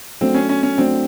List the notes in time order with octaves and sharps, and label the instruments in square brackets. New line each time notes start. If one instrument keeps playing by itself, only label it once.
[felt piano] F#3 A3 D4 [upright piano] C4
[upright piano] C#4
C#4
C#4
[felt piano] F#3 A3 D4 [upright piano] C4